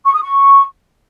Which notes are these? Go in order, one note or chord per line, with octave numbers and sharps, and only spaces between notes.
C#6
D#6
C#6